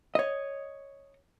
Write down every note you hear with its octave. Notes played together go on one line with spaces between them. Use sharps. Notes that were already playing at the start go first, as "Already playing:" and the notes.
C#5 D#5